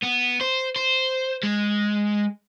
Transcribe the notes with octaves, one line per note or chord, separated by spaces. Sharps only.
B3
C5
C5
G#3